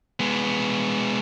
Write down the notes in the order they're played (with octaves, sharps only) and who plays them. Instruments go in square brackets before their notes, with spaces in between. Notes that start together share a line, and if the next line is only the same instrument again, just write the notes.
[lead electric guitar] G#3 B3